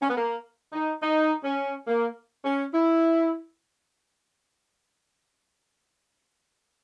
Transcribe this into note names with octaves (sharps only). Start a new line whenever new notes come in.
C#4
B3
A#3
D#4
D#4
C#4
A#3
C#4
E4